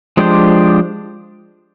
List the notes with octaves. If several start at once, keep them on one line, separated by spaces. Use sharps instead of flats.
F3 G#3 D4 G4 C5